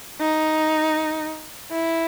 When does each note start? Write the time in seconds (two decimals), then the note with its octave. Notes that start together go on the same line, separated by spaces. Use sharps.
0.20 D#4
1.71 E4